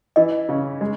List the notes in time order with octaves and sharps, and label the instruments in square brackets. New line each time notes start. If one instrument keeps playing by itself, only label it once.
[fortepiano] E3 [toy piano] D#5
[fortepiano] C#3
G#3